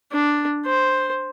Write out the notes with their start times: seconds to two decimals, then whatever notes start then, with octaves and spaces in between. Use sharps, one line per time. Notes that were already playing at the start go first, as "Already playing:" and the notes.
0.12 D4
0.66 C5